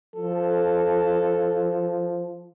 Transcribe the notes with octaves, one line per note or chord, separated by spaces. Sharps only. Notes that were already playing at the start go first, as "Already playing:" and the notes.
F3 A4